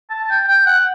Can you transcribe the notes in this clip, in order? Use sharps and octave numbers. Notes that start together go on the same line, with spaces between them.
A5
G5
G5
F#5